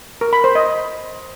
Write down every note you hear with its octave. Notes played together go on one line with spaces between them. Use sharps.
A#4
B5
C5
D#5